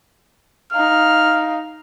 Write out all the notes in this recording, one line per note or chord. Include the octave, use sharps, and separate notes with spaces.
D#4 F5 F6